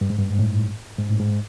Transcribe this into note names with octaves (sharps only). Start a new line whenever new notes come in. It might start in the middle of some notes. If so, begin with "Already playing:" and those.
G2
G#2
G2
G#2
A2
G#2
A2
G#2